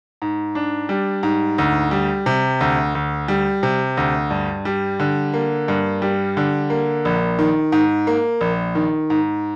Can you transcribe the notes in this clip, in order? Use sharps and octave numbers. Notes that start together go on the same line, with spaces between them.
G#2
D4
G3
G#2
D2
G3
C3
D2
D2
G3
C3
D2
G2
G3
D3
A#3
G2
G3
D3
A#3
A#1
D#3
G#2
A#3
A#1
D#3
G#2